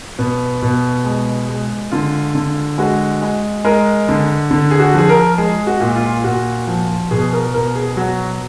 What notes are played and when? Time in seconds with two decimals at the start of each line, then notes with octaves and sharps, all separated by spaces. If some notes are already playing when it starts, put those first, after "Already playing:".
0.19 B2 B3
0.62 B2
1.05 G#3
1.49 G#3
1.92 D3 F4
2.35 D3
2.78 G#3 F#4
3.22 G#3
3.64 G#3 A#4
4.09 D3
4.51 D3
4.71 G#4
4.80 F#4
4.94 F3 G#4
5.09 A#4
5.38 G#3 G#4
5.67 F#4
5.80 A#2
5.96 F4
6.24 A#2 F#4
6.68 F3
7.11 B2 G#4
7.33 A#4
7.54 B2 A#4
7.75 G#4
7.97 F#3 F#4